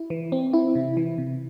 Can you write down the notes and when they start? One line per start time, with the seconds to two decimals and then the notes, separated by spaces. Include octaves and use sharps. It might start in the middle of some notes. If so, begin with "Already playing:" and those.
Already playing: E4
0.10 E3
0.32 C4
0.53 E4
0.75 C3
0.97 E3
1.18 C3